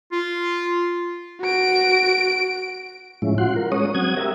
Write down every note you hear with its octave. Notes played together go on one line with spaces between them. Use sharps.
F4
F#4 D7
A2 F3 G#3 C#4 E4
F4 F#4 F#5 C6
A#4
G#3 C#4 C#5 D#6
F#3 C4 F#5 D#6 G#6
G4 A#4 E5